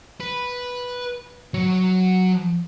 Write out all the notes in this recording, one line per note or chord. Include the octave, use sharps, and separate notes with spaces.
B4
F#3 C#5